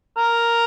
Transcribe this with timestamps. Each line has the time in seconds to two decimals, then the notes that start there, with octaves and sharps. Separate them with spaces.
0.17 A#4